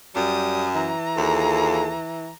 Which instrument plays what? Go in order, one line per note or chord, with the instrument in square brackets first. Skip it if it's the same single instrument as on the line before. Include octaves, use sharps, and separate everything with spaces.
[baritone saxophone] F#2 [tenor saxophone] G3 [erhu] D#6
[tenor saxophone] E3 [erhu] A#5
[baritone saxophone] D#2 [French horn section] F4 G#4 A4